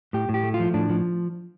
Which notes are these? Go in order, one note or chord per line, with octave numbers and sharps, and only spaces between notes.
A2 G4
A2
G4
A3
F4
F3
A2 D4
F3